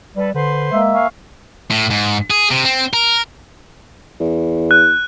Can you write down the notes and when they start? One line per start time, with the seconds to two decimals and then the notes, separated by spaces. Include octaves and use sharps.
0.16 G3 A4 B4
0.34 D3 B4 C5 C6
0.72 G#3 A#3 E5
0.93 F5 G#5 C#6
1.71 A2
1.91 G#2
2.31 G#4
2.51 C3
2.65 C4
2.93 A#4
4.20 E2
4.71 F#6